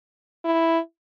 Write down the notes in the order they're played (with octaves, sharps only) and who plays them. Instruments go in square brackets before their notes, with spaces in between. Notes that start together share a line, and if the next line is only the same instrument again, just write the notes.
[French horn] E4